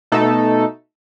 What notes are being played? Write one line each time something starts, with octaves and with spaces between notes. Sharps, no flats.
B2 A3 D#4 A4